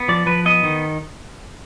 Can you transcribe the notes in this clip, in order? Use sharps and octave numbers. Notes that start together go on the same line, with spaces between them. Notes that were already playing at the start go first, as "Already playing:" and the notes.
Already playing: B3
F3 D5
F3 B4
B3 D#5
D#3